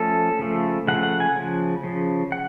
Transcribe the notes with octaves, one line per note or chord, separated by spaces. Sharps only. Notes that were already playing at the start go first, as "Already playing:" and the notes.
Already playing: F3 A3 C#4 A4
C#3 F3 A3
C#3 F3 A3 F#5
F#5
G#5
C#3 F3
C#3 F3
F#5